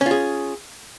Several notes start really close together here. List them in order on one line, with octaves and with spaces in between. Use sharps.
C#4 F4 G#4